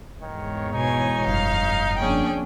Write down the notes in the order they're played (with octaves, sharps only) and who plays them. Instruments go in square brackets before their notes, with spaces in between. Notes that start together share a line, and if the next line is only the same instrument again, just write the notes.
[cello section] E2 G#2 C#5 [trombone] D#3
[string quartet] B2 G#5 [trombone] D#4
[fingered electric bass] F1 G2 [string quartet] F5
[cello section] F2 A#3 D4 [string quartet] C#4 G#4 G5